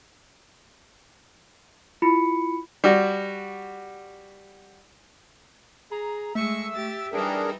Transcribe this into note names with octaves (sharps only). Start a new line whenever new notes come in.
E4 F4 B5 C#7
G3 F#4
G#4 A#5
G#3 A3 E5 C#6 E6
G4 A6
E3 G3 D4 D#4 G#4 A#4 G5